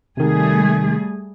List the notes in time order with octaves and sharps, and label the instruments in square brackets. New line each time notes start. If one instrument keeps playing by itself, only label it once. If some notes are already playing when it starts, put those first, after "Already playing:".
[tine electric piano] C3 D#3 [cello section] G3 A3 G#4